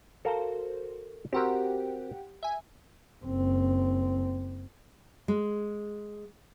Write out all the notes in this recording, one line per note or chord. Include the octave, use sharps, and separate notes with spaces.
F#4 A4 A#4 C5 F5
C4 F#4 G4 A#4 F#5 G5
E5 G#5
F#1 C4
G#3